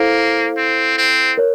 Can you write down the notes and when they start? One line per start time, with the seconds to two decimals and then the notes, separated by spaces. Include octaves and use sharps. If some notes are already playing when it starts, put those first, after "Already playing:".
Already playing: A#3 E4 A4 C5 F5
0.57 C4
0.98 C4
1.38 A#4 C#5